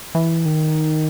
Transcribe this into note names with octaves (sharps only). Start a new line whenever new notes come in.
E3
D#3